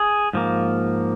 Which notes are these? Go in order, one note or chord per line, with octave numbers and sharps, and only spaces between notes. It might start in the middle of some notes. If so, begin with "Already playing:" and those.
Already playing: G#4
G#2 F3 A#3